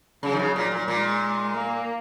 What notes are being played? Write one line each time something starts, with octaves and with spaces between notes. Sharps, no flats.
C#3 F#3
D#3
C#3
A#2
A#2
A#2 G#3
A#3